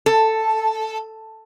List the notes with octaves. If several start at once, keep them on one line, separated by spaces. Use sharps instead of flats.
A4